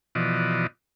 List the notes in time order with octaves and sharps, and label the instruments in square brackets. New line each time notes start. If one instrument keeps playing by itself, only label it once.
[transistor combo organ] B2 E3 F3 F#4 D5 D#5